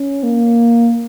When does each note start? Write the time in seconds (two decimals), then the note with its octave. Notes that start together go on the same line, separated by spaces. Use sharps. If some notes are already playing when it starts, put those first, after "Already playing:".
Already playing: C#4
0.24 A#3